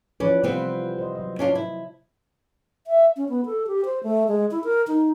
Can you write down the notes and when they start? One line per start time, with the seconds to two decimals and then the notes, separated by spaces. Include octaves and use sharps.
0.20 E3 F3 C#4 B4 D5
0.43 C3 G3 B3 C4 F4
0.99 C5 D#5
1.15 F#3 D#5
1.39 C#4 D4 F4
1.55 E4
2.87 E5
3.17 C#4
3.29 B3
3.46 A4
3.67 G4
3.85 C5
4.03 A3
4.28 G#3
4.51 E4
4.64 A#4
4.88 D#4